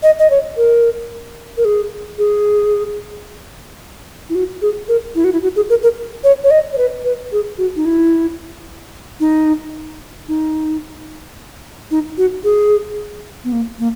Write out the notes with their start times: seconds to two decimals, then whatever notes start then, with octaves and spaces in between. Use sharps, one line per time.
0.03 D#5
0.19 D#5
0.30 C#5
0.57 A#4
1.57 A#4
1.65 G#4
2.18 G#4
4.29 E4
4.35 F#4
4.62 G#4
4.88 A#4
5.15 E4
5.24 F#4
5.33 E4
5.43 F#4
5.56 G#4
5.70 A#4
5.83 A#4
6.24 C#5
6.44 C#5
6.51 D#5
6.73 C#5
6.78 B4
7.05 B4
7.32 G#4
7.58 F#4
7.76 D#4
7.85 E4
9.20 D#4
10.28 D#4
11.91 D#4
12.18 F#4
12.44 G#4
13.44 B3
13.52 A#3
13.79 A#3